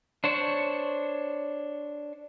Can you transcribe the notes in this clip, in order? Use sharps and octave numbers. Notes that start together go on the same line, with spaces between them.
D4 C5 C#5